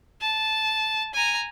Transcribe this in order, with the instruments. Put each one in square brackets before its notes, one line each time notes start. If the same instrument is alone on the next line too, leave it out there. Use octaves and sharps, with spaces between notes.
[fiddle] A5
G#5 A#5